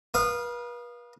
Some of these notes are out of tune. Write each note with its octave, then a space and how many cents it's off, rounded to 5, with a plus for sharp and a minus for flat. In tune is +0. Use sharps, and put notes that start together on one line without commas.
B4 -40 F5 +0 D#6 -25